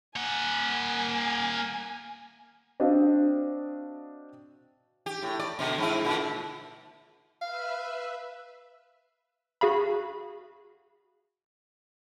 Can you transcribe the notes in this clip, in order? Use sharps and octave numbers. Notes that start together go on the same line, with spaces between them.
A#3 F#5 G#5
C4 D4 F#4 D#5 F5
G4
A2
D5
B2 D3
G#2 E4
A#2 D3
B4 E5 F5
F#4 G#4 F5 B5